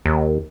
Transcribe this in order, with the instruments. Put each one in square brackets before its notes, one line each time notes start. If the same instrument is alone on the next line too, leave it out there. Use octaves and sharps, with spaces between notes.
[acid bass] D#2